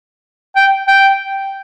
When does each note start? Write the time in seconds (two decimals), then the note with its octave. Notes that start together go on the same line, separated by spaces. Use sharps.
0.56 G5
0.88 G5